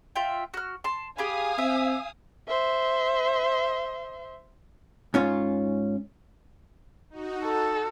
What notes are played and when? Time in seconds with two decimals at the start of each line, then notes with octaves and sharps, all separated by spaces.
0.16 F4 E5 G5
0.54 F#4 F6
0.84 A5 C6
1.18 G4 G#4 F5 G#5 B5 D#6
1.58 C4 E5
2.48 C5 E5
5.14 G#2 C#4 F4 C#5
7.10 D#4 F#4
7.44 A4